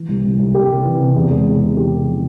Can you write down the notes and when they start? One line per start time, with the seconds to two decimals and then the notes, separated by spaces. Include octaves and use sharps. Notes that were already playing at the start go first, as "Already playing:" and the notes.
Already playing: E3
0.09 C2
0.24 C2
0.39 C2
0.54 G3 G4
0.70 C3
0.84 E3
1.00 C3
1.16 E2
1.31 G#3
1.46 C3
1.61 E2
1.76 C3 G4
1.91 C3
2.06 F3